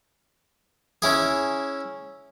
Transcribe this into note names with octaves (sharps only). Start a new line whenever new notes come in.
C#4 E4 G#4